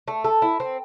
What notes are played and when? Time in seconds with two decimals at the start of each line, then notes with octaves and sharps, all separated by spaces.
0.08 A3
0.24 A4
0.42 E4
0.60 C4